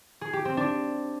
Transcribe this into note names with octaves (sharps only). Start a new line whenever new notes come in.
G#4
G4
C4
D4